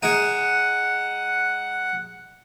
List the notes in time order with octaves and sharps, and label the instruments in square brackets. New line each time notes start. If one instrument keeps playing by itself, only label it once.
[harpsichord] G#3 D#4 [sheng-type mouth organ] F#5